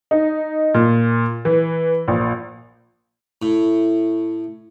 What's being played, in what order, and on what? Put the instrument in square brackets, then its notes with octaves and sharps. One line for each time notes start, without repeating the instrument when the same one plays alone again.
[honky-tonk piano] D#4
A#2
E3
A#1
[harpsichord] A2